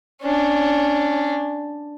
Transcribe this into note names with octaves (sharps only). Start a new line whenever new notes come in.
C#4 D4